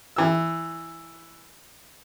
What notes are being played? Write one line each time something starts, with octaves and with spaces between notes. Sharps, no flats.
E3 E6